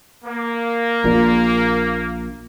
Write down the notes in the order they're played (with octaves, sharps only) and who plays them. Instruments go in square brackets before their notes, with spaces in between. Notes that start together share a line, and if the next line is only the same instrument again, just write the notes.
[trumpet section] A#3
[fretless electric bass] A#1 A#2